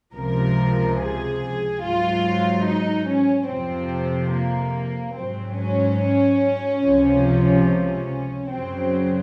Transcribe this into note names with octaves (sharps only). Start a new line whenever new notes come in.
C#2 C3 F3 A#4
G#4
G#2 F#3 F4
D#4
C#4
F2 C3 F3 C4
A#3
G#2 F#3 C4
C#4
C#2 C3 F3
C#4
F#2 C#3 F#3 C4